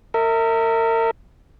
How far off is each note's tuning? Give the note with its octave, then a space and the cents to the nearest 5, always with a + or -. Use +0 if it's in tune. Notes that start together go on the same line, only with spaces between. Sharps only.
A#4 -35 E5 -30